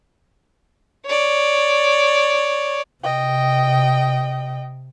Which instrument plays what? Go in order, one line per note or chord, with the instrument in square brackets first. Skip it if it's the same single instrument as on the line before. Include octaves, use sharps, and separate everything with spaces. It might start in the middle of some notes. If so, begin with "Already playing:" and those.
[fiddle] C#5 D5
[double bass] C3 [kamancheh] D#5 G5